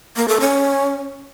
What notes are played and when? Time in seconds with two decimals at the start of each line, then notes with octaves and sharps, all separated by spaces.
0.16 A#3
0.28 A4
0.40 C#4